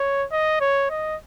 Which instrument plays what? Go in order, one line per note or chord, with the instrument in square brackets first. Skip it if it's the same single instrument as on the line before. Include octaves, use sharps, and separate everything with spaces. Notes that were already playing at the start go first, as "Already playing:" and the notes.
Already playing: [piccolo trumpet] C#5
D#5
C#5
D#5